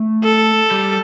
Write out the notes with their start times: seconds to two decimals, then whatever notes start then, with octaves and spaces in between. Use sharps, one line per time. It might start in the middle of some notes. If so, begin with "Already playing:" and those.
Already playing: A3
0.24 A4
0.71 G3